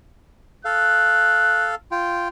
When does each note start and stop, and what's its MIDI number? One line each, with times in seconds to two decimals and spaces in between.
0.65 1.75 69
0.65 1.75 77
0.65 1.71 90
1.91 2.28 65
1.91 2.28 79